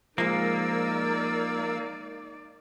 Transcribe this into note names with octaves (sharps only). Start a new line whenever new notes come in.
F3 G#3 A#3 D#4 A#4 D5 E6